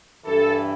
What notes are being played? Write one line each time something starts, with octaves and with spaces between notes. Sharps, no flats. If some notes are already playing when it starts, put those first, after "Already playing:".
G2 E3 A4